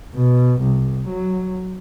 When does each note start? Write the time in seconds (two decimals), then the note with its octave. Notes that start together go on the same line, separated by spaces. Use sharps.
0.14 B2
0.61 C2
1.08 F#3